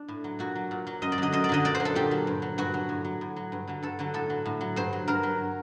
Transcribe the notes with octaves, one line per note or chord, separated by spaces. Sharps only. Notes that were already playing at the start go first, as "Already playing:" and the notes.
Already playing: D4
A2
F#3
A#2 F#4
F#3
A#2
F#3
F#2 D#5
D5
D3 F#3 D#5
F#2 D#5
D5
D3 F#3 D#5
A#2 D5
C5
F#3
A4
A#2 G4
F#3
G2
F#3
G2 F#4
F#3
A2
F#3
A2
F#3
G2
D3 F#3
G2 A4
D3 F#3
A2 A4
F#3
A2
F#3
G2 C5
F#3
G2 A#4
F#3